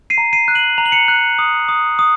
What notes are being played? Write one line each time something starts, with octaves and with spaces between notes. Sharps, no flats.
C7 D#7
A#5
C7 D#7
F#6
D#7 F#7
A#5 F7
F#7
C#7 F7
F#6
D#6
D#6
D#6